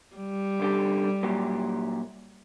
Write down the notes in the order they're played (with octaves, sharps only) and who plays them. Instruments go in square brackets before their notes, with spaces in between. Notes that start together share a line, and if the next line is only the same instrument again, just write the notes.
[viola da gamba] G3
[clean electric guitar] C2 D3 G4
A#2 F#3 G4